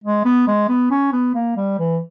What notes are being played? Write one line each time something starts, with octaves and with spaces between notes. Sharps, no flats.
G#3
B3
G#3
B3
C#4
B3
A#3
G3
E3